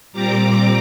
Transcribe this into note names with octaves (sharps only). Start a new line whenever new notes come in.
A#2 G3 C4 A#5 D6